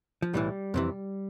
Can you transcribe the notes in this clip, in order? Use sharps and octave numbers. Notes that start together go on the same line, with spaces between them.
F3
B1 A2 E3 G3
F2 C3 E3